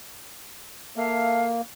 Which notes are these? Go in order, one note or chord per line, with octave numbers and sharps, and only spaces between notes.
A#3 A4 E5 F5